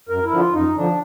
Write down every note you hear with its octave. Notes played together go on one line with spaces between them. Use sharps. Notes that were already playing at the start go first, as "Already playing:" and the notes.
F#2 A#4
E4
D3 F3
F4
F#2 D#4
D3 F3 D4